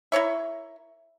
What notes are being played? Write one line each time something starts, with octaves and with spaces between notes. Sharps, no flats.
E4 A#4 C#5 E5